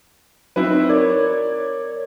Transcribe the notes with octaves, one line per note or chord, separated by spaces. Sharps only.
F#3 C4 D#4 E4 F#4 B4
A#4 C#5 D5 G#6